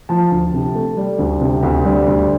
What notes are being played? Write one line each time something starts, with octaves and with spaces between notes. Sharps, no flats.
F3 A5
D2
C3
A3
G3
D2
C3
D2
G3
D2